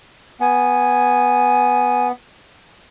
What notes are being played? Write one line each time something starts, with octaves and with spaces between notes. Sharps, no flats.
B3 G#5